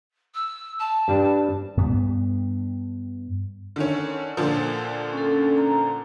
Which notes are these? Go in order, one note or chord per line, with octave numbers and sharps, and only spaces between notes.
E6
A5
G2 G3 D4
G2 B3
D3 D#3 C#4
A#2 D3 F3
C#4 A4
A#5